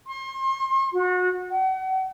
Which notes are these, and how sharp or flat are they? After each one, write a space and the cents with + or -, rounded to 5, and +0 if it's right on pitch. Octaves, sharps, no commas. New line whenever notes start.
C6 +35
F#4 -30
F#5 +40